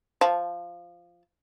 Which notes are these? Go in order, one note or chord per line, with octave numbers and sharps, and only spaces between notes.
F3 A5